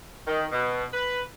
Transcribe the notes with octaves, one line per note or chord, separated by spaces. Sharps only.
D#3
B2
B4